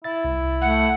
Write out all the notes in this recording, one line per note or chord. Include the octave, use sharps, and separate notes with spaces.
E4 E5 A6
C2
A3 F#5